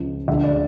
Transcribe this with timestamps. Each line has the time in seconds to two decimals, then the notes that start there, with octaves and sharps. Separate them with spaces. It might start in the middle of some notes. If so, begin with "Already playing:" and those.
Already playing: C#2 C#3 F3
0.28 D2 D3 F3 E5
0.44 D5